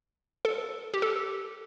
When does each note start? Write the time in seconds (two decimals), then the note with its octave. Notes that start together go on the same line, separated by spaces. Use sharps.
0.45 A4
0.94 G4
1.02 A4